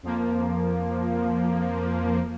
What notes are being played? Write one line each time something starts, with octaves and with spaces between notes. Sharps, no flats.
F2 F3 A#3